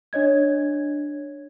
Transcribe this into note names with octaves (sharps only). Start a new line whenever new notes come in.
D4 C#5 D#5 G#6